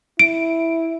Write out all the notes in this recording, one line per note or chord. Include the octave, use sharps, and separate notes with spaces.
E4 D7